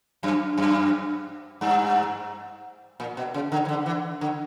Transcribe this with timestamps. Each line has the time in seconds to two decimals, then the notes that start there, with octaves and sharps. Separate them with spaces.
0.23 F#2
0.58 F#2
1.61 G2
3.00 A#2
3.17 B2
3.34 C#3
3.52 D3
3.65 E3
3.69 D3
3.86 E3
4.21 D3